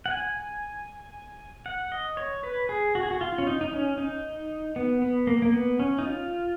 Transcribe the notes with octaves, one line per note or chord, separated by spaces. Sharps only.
F#5
G#5
F#5
D#5
C#5
B4
G#4
F#4
G#4
F#4
F4
C#4
D#4
D#4
C#4
D#4
B3
B3
A#3
A#3
B3
C#4
D#4
F4